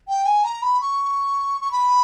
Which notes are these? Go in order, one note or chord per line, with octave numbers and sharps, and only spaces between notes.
G5
G#5
A#5
B5
C#6
C#6
B5